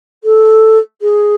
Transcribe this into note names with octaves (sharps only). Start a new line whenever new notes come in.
A4
G#4